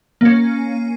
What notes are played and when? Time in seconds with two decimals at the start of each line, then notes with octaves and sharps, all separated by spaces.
0.21 A#3 C#4